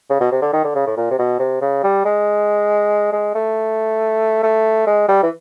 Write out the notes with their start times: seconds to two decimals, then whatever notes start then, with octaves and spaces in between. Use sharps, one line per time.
0.10 C#3
0.20 B2
0.32 C3
0.42 D3
0.53 D#3
0.64 D3
0.75 C#3
0.86 A2
0.97 A#2
1.11 C3
1.19 B2
1.39 C3
1.61 C#3
1.83 G3
2.05 G#3
3.12 G#3
3.35 A3
4.43 A3
4.87 G#3
5.08 G3
5.23 E3